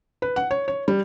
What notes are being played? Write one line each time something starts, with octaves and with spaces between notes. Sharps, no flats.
B4
F#5
C#5
C#5
G3